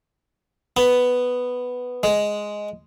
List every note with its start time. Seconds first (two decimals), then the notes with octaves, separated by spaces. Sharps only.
0.77 B3
2.03 G#3